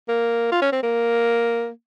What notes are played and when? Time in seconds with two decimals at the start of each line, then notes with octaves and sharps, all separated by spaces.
0.08 A#3
0.52 F4
0.62 C#4
0.72 C4
0.83 A#3